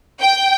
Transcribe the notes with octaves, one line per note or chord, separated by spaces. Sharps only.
G5